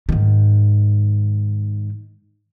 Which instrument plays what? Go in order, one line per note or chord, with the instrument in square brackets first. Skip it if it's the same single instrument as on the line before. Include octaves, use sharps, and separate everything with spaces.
[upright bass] G#2 D#3